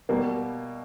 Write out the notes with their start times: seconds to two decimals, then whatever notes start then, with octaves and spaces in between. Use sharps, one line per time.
0.09 B2 G3 A#3